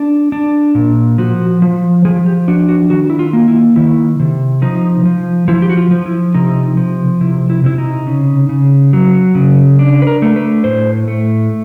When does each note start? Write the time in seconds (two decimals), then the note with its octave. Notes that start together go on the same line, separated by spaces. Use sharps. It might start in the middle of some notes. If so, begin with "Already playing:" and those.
Already playing: D4
0.32 D4
0.75 A#2
1.18 F3 F#4
1.62 F3
2.05 F3 G#4
2.26 G4
2.48 D4 F#4
2.69 F#4
2.90 D#3 F#4
3.10 E4
3.19 F4
3.33 A#3
3.48 E4
3.76 D#3 E4
4.20 C3
4.62 F3 D#4
5.05 F3
5.48 F3 E4
5.62 G4
5.69 F#4
5.77 F4
5.91 F3
6.06 E4
6.34 C3 D#4
6.77 F3
7.21 C3 E4
7.50 E4
7.64 C3 E4
7.78 D#4
8.07 C#3
8.49 C#3
8.93 F#3
9.35 C#3
9.79 D4
10.02 B4
10.07 A#4
10.22 A3
10.36 B4
10.64 A2 C5
11.08 A3